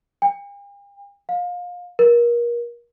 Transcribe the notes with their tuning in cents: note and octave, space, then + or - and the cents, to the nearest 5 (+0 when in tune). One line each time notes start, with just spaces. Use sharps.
G5 +45
F5 +30
A#4 +30